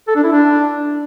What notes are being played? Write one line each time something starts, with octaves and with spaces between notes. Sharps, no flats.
A4
D4
E4
D4